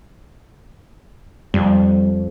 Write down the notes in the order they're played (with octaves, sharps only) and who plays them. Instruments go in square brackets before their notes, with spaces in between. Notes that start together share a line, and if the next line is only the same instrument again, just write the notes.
[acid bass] F2 [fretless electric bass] G3